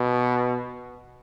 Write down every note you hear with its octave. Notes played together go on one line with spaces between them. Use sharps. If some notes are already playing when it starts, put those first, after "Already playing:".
Already playing: B2